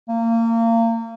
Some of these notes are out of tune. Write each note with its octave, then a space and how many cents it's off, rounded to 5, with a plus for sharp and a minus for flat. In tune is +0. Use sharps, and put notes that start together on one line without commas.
A#3 -30